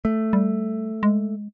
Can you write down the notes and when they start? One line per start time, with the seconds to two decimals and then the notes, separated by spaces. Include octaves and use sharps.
0.05 A3
0.33 G3
1.03 G#3